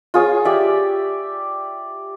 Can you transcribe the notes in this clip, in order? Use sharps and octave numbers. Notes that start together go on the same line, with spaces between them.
F4 G#4 C#5
G4 D5 E5